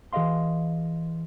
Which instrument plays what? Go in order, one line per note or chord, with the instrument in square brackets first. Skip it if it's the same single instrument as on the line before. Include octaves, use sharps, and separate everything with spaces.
[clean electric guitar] E3 G#4 C5 D#5 F5 C6